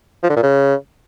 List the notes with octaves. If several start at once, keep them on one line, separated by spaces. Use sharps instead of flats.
F3
D3
A#2
C#3